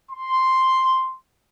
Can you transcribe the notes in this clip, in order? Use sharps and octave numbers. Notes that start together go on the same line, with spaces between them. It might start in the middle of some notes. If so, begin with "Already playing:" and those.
C6